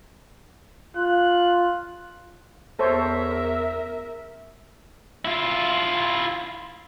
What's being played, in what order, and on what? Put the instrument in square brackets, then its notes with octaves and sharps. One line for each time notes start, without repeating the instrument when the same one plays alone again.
[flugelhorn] F4 [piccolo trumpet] F#6
[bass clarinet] E2 [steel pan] A4 C5 C#5 [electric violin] A#4 E5
[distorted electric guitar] E4 F4